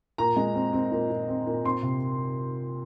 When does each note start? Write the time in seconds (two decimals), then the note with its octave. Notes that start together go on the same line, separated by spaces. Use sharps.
0.18 A#2 A#5
0.37 G#3
0.55 C4
0.73 C4
0.91 A#2
1.10 A#2
1.28 C4
1.47 A#2
1.64 C4 C6
1.83 C3